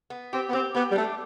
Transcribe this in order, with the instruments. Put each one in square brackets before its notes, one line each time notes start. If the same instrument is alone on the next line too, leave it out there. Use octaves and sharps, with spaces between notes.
[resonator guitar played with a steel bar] B3
[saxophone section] C4 [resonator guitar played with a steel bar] G4
[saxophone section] B3
[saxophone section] C4 [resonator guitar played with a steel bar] G4
[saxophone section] B3 [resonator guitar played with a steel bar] G4
[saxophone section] G3
[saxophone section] A3 [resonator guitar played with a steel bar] D4